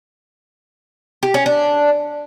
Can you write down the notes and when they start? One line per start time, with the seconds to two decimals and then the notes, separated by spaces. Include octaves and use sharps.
1.23 G4
1.34 C#4
1.46 D4